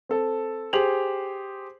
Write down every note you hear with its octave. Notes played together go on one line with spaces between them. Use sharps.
C4 A4
G4 G#4 C5 F7 F#7